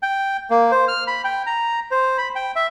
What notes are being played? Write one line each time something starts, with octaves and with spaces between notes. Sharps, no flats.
G5
A#3
C5
F6
B5
G5
A#5
C5
B5
G5
E5